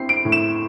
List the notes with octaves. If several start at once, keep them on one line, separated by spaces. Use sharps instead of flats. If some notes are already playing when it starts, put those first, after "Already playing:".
Already playing: C4 E4 C7
D7
A2
E7